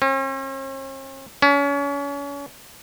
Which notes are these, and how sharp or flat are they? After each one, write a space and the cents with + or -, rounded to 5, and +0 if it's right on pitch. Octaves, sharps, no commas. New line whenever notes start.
C#4 -45
C#4 +35